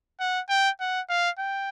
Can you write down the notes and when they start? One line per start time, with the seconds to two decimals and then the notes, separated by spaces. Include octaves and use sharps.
0.20 F#5
0.49 G5
0.80 F#5
1.09 F5
1.39 G5